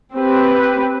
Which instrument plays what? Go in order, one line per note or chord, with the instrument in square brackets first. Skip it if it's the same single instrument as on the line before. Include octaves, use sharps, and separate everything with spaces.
[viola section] C4 G4 B4